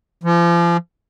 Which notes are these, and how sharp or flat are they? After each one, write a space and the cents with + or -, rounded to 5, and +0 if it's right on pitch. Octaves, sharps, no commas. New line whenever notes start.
F3 -35